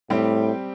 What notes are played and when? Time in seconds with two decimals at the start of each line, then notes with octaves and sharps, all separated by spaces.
0.10 A2 G3 C4 G4